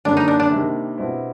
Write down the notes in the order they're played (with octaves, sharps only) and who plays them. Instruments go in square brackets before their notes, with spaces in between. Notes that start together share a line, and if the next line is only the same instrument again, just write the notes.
[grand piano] F#2 D3 G3 A#3 C#4 [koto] D4
[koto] D#4
D4
D4
[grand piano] C3 D#3 G3 A#3
B2 G3 C4 E4